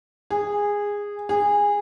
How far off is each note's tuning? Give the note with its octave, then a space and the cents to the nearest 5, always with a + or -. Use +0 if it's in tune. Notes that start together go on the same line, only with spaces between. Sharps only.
G#4 -15
G#4 -20